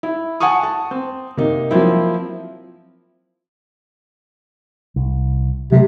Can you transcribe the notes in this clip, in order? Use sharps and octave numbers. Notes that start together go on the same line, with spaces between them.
E4
F#5 G#5 A5 C#6 D#6
A5
C4
C3 A#3 D#4
F3 F#3 A#3 C4 E4
C2
C3 F#3 G3 A3